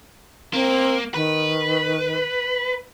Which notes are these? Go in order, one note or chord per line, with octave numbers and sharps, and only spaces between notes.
A#3 C4
D#3 B4